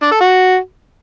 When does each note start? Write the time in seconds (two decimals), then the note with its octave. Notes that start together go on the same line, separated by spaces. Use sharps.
0.02 D4
0.12 A4
0.21 F#4